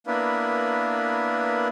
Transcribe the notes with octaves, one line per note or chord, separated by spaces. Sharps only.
A#3 B3 D4 E4 A#4 B4